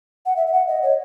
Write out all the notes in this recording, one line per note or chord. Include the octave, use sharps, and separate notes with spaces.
F#5
E5
E5
F#5
D#5
C#5